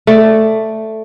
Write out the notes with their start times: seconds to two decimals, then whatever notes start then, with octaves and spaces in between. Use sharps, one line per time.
0.07 A3 D5